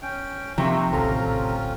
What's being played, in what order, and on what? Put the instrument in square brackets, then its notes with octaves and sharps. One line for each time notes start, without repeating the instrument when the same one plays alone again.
[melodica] C#4 G5
[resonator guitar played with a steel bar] C3 [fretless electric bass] D#3 F3 [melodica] A#3 [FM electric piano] A#5 C#6
[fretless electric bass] D1 [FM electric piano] A#1 A4 A#5 [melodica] C4 C#4 F4